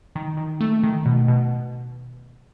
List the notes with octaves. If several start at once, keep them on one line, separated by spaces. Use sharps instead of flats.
D#3
D#3
A3
D#3
B2
B2